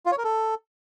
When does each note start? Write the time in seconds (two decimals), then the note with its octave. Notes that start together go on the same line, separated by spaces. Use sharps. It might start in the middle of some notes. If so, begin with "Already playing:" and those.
0.06 F4
0.12 C#5
0.18 A#4
0.24 A4